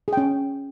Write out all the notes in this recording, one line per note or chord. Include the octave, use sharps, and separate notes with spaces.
C#4 G#4 G5